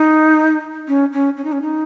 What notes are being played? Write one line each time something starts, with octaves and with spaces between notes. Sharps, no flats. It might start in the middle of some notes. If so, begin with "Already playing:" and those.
Already playing: D#4
C#4
C#4
C#4
D#4
C#4
D#4